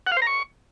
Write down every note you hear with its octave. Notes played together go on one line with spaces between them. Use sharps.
F#5
F5
C5
A#5
C#6